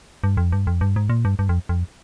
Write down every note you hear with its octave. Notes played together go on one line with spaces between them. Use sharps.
G2
F2
G2
F2
G2
G#2
A#2
G2
G2
F2
F2